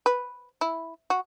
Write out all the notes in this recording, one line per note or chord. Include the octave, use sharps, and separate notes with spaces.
B4
E4
F#4